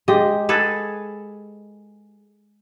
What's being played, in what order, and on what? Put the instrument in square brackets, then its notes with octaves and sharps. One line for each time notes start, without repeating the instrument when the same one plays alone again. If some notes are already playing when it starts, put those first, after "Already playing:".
[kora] G#3 G4 [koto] D#5
[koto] G#4 A4 B4